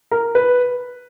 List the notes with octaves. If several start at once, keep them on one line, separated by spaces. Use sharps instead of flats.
A#4
B4